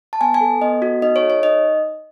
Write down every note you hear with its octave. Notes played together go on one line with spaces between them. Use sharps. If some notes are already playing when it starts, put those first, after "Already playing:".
A5
B3 G#5
G#5
A4
B3 D#5
F#4
D#4 D#5
C#5
A4
C#5
D#4 D#5